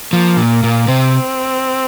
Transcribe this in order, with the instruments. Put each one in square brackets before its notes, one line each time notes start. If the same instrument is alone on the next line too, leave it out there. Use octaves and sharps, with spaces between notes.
[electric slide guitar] F3 [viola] A#3
[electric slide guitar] A#2
A#2
[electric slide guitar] C3 [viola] C4